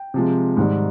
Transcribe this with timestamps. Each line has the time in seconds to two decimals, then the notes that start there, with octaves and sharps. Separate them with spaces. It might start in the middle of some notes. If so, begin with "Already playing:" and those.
Already playing: G5
0.14 C3 F3 G#3
0.57 G#2 D#3 G3